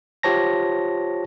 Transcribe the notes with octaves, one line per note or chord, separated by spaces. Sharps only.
F4 G4 C5 C#5 A5 A#6